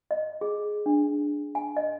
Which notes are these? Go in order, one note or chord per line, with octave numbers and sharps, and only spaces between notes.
D#5
G#4
D4
G#5
D#5